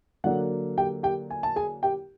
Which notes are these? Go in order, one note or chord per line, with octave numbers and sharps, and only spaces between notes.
D3 F#3 A#3 D4 F#5
G4 G5
G4 G5
G#5
A5
G#4 G#5
G4 G5